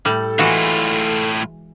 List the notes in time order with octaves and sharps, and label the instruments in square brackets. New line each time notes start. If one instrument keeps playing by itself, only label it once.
[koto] A2 G3 [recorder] A4
[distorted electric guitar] A2 F4 [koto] E3 G#3 F#4